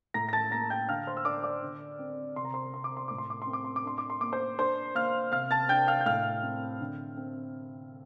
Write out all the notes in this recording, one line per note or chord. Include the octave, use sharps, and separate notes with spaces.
A2 A#5 A#6
A#6
A5 A6
A#3 A#5 A#6
G5 G6
D3 F5 F6
C5 C6
E6
D4 D5 D6
D5 D6
D3
C4
C3 C6
A#5
C5 C6
C4 C6
D6
C6
A2 D6
C6
D6
C6
C4
D6
C6
D6
D4 C6
D6
C6
A#3 D6
C5 C6
D4 C5 C6
A#3 F5 F6
C3 F5 F6
A5 A6
D4 G5 G6
F5 F6
G6
A2 F5 F6
C4
D3
C4